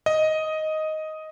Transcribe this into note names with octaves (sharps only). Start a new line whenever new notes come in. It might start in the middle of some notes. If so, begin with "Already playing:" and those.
D#5